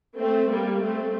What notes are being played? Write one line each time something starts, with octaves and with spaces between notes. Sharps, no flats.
A3 C4
G3 A#3
A3 C4